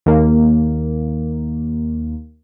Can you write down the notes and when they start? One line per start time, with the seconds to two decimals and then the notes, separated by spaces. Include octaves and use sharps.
0.06 D#2 A#3